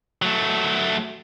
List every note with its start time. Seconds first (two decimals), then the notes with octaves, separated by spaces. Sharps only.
0.22 F#3 A3